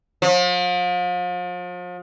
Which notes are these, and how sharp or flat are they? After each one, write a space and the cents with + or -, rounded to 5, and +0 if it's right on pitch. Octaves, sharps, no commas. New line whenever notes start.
F3 +40